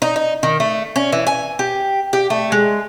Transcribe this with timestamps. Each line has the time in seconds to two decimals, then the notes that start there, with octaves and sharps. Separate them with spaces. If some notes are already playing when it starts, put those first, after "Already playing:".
0.02 D#4
0.16 D#4
0.43 D#3
0.60 A3
0.96 C#4
1.12 E3
1.27 G#5
1.59 G4
2.13 G4
2.30 A3
2.52 G#3